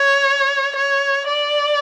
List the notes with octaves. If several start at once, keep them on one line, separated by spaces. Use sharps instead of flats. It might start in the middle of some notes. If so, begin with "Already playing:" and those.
Already playing: C#5
C#5
D5